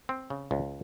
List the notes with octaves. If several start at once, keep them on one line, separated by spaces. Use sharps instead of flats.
C4
C#3
C#2